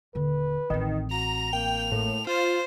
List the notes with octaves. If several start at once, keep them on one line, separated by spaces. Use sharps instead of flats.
D#1 D3 B4
A1 D#3 C4
F#4 A#5 F7
A#3 G5
A2
F4 C5